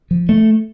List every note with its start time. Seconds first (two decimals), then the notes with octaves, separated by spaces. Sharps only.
0.11 F3
0.29 A3